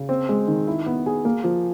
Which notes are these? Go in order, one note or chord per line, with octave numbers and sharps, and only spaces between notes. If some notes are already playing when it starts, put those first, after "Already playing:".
Already playing: C#3
C4
G#3
D#3
E4
B3
G#4
A#3
F3